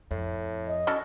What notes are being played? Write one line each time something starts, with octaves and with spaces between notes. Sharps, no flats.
F2 A2
D#5
C#4 F#4 A4